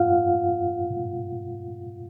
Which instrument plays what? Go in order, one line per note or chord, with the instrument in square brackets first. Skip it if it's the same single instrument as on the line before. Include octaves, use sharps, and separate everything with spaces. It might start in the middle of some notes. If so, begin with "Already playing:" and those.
Already playing: [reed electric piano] F4 F5 F#5